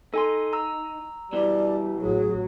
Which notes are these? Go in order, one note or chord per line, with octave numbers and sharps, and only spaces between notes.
D#4 A4 G#5 C6
A#5 E6
B2 E3 G3 D5
A1 F#3 G#4